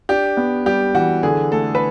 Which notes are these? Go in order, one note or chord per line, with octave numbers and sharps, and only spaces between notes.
D4 G4
B3
G3 G4
E3 F#4
D3 G#4
A3 A4
B4